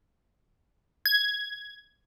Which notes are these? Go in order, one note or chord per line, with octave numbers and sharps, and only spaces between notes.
G#6